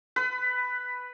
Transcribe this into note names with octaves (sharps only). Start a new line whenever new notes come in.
B4